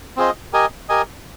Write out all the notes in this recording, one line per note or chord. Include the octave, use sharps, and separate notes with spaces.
C4 F4 G#4 C5 D#5
G4 A#4 D#5 G#5
G4 A#4 D#5 G#5